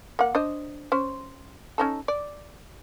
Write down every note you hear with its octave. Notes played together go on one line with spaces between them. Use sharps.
A#3 F#5
D4 C5 D#5
C#4 C5
C#4 D#4 A4
D5